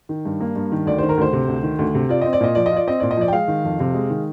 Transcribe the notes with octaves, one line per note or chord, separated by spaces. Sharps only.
D#3
G2
A#3
G2
D#3
D2 D5
D#3 C5
A#4
D2 C5
C3
D2
D#3
D2
C3
F4 D5
C4 D#5
D5
A#2 D#5
F3 D5
D#5
F4 D5
C4 D#5
A#2 D5
D#5
F3 D5
G5
G#3 F5
D#3
F2
C3
G#3
D#3